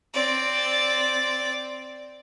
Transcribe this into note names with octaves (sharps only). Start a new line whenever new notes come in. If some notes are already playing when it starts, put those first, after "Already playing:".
C4 D5